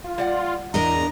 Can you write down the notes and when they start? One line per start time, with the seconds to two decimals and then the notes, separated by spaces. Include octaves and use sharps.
0.04 F4
0.18 G3 D5 F#5
0.74 E2 D4 A#4 D#5 A#5